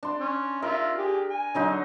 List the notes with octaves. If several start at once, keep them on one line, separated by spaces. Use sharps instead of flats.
D4 C6
C#4
F4 A#4 E5
G4 G#4
G#5
D3 F#3 D#4